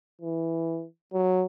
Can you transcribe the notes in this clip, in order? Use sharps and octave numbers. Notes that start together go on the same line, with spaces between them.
E3
F#3